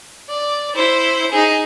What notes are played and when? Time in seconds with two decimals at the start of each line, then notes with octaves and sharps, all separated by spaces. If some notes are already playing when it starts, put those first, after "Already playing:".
0.29 D5
0.75 E4 C5
1.32 D#4 G#4